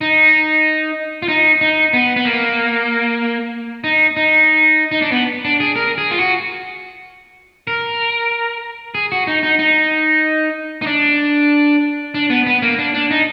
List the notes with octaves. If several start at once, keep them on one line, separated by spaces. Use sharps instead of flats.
D#4
F4
D#4
D#4
B3
B3
A#3
D#4
D#4
D#4
D4
B3
D4
G#4
A#4
G#4
F4
F#4
A#4
G#4
F#4
D#4
D#4
D#4
D#4
D4
D4
B3
B3
A#3
D4
D4
D#4